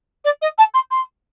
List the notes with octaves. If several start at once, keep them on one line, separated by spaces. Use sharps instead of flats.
D5
D#5
A5
C6
C6